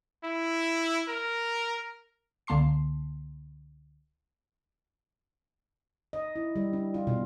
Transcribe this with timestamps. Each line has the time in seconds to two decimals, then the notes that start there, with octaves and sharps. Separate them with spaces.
0.23 E4
1.08 A#4
2.47 C#2 D3 A#3 A5 C6 C7
6.13 D#5
6.36 E4
6.56 G3
6.73 D4
6.94 F4
7.07 B2